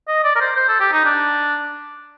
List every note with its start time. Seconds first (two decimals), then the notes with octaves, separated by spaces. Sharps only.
0.08 D#5
0.24 D5
0.36 A#4
0.41 C5
0.56 C5
0.68 A4
0.80 G4
0.92 D#4
1.05 D4